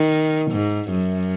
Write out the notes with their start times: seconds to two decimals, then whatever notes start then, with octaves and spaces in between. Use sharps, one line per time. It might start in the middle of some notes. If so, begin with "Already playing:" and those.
Already playing: D#3
0.52 G#2
0.90 F#2